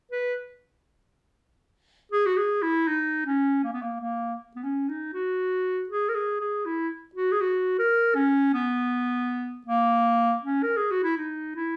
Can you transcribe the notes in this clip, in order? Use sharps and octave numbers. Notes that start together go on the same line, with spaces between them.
B4
G#4
F#4
G#4
E4
D#4
C#4
A#3
B3
A#3
A#3
B3
C#4
D#4
F#4
G#4
A#4
G#4
G#4
E4
F#4
G#4
F#4
A#4
C#4
B3
A#3
C#4
A#4
G#4
F#4
E4
D#4
E4